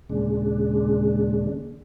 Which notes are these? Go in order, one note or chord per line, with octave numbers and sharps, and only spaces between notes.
D#2 A#2 C#3 G#3 D4